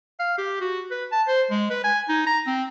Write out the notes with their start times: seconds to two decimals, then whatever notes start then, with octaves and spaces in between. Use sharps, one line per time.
0.20 F5
0.38 G4
0.61 F#4
0.91 B4
1.12 A5
1.28 C5
1.51 G#3
1.70 B4
1.84 G#5
2.09 D#4
2.27 A#5
2.47 C4